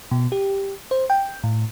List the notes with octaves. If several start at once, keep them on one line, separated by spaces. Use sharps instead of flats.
B2
G4
C5
G5
A2